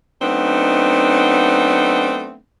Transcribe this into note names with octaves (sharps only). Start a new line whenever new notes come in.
F#3 A3 B3 C4 D4 D#4